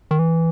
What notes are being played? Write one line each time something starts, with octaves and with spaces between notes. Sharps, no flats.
D#3
E3